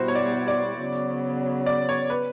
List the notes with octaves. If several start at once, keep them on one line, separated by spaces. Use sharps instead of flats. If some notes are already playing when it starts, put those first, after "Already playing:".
Already playing: B2 G3 B3 E4 F#4 C5
C#5
D5
D5
C#3 F#3 B3
D5
C#5
B4